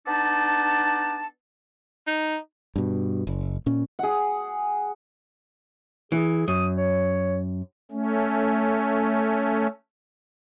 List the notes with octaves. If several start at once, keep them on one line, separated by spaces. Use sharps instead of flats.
B3 D4 D#4 D5 A5
D#4
G2 B2
F#1
A#2 C#4
G#4 F#5
E3 G#4
F#2 D#6
C#5
A3 C#4